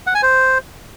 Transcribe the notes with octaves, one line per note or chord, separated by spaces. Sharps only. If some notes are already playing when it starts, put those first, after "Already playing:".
F#5
G#5
C5